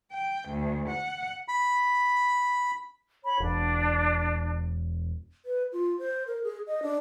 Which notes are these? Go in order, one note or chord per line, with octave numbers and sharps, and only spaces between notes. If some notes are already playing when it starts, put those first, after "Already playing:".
G5
D2
F#5
B5
C#5 B5
E1 D4
B4
F4
C5
A#4
G#4
D#5
D4